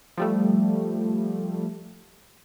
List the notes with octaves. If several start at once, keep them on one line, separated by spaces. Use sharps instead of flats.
F3 G3 A3